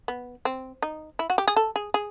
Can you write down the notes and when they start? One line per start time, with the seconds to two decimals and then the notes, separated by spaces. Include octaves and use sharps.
0.08 B3
0.45 C4
0.82 D#4
1.19 E4
1.30 F#4
1.38 G4
1.48 G#4
1.56 A4
1.76 G#4
1.94 G#4